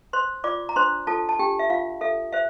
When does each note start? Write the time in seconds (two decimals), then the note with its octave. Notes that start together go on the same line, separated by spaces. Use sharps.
0.13 C5 C6
0.44 F4 D5 D6
0.69 A#5
0.76 D4 C5 C6
1.07 F4 A4 A5
1.29 A5
1.39 D4 G4 G5
1.59 E5
1.70 F4 F5
2.01 A4 E5
2.33 C5 E5